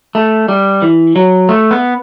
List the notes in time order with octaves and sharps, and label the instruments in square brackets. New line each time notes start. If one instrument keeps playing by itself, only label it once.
[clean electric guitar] A3
G3
E3
F#3
A3
B3